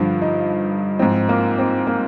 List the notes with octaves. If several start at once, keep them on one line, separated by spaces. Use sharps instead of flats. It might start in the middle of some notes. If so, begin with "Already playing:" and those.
Already playing: G2 D3 F3
D#4
G#2 F3 C4
A#3
C4
A#3